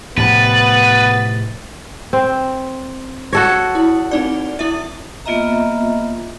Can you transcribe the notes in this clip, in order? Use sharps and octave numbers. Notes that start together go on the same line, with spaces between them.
A2 C3 F3 B3 B4 A6
C4
F#4 A4 C#5 A#6 C#7
E4
C4 D#4 D5
E4 E5
A#3 B3 F4 D#5 E5 A#5